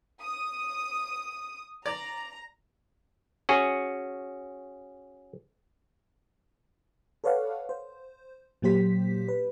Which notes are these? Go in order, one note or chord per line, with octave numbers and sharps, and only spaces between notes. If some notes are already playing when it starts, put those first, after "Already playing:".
D#6
D5 A#5
C#4 F#4 G#4
A4 B4 C#5 D5 F5 F#5
C5
A#2 F#3 A#3 G4 C5 B6
B4